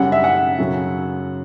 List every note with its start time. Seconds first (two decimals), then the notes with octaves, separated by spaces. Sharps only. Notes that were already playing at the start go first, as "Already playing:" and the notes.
Already playing: F#2 C#3 G3 F#5
0.12 E5
0.24 F#5
0.59 F#2 C#3 F#3